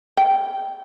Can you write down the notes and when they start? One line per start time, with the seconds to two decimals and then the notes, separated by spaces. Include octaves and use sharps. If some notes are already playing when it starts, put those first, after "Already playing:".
0.17 G5